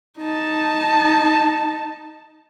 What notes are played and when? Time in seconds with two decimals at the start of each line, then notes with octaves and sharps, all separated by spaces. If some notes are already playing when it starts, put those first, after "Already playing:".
0.19 D#4 A5